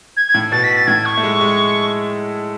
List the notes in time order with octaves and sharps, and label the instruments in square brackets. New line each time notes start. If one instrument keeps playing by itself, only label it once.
[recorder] G#6
G#6
[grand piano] A2
[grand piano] B2 [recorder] A6
[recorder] B6
A6
[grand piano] A2 [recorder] G#6
[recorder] C#6
[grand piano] A3
G#3
G#3